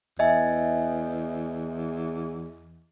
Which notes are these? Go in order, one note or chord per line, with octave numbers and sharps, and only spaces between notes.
E2 D#5 E5 G#5